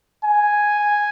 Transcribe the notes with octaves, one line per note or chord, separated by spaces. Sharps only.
G#5